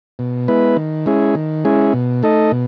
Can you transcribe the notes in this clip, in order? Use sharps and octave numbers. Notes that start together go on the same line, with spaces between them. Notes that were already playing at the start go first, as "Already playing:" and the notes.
B2
G#3 B3 E4 B4
D#3
G#3 C#4 E4 G#4
D#3
G#3 C#4 E4 G#4
B2
A3 D#4 A4 D#5
B2